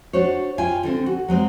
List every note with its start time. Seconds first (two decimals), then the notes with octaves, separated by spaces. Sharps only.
0.13 D4 F#4 C5 C#5
0.58 F4 G5 G#5
0.83 D3 G3 C4
1.06 F#4
1.28 F#3 G#3 C4 C5